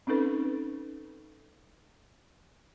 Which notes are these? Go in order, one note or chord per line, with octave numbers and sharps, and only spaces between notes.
C4 C#4 D#4 A4 B4